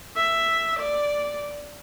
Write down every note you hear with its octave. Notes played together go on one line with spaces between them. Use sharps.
E5
D5